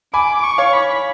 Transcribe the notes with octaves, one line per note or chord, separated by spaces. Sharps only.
G#5 B5 D6
C#6
C#5 F5
B5